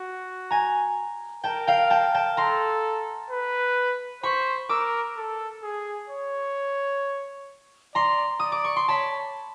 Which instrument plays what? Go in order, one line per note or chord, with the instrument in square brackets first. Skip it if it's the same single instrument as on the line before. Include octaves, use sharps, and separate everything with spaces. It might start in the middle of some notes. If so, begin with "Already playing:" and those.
Already playing: [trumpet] F#4
[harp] G#5 A#5
[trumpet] A#4 [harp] G5 A5
[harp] F5 G5
G5 A5
G5 A5
[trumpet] A4 [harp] A#5 C6
[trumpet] B4
[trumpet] C5 [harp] B5 C#6
[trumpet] A#4 [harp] D6 E6
[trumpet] A4
G#4
C#5
[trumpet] D5 [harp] A#5 C6
[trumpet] D5 [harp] D#6
[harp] D6
C#6
C6
[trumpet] C#5 [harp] A5 B5